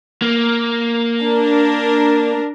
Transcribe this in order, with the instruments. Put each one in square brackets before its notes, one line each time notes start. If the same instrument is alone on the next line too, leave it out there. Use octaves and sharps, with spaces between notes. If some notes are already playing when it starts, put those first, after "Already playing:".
[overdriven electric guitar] A#3
[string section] D4 A#4